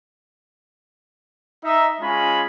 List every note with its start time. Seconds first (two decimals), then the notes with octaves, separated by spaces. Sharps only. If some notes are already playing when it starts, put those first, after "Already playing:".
1.64 D#4 E5
2.01 G#3 C#4 F4 G#5 B5